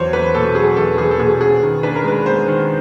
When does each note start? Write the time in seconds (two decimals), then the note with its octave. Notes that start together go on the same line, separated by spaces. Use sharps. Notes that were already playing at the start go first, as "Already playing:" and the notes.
Already playing: E2 F#3 C5 C#5
0.13 E2 B4
0.35 B2 A4
0.55 F#3 G#4
0.77 E2 A4
0.98 E2 G#4
1.11 A4
1.19 B2 G#4
1.41 B3 G#4
1.63 D#3
1.83 D4 B4
1.96 A#4
2.04 G#3 B4
2.26 B3 C5
2.48 D#3